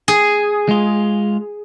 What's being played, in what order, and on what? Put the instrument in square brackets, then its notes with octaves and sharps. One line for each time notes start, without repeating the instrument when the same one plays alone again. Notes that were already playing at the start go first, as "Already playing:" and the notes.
[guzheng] G#4
[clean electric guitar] G#3 F4